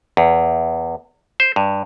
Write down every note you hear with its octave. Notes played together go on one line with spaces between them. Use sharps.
E2
C5
G2